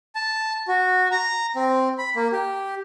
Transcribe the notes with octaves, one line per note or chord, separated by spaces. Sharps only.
A5
F#4
A#5
C4
B5
A#3
G4